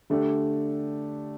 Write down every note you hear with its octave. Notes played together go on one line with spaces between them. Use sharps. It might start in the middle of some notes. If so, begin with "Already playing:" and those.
D3 A3 D4 G4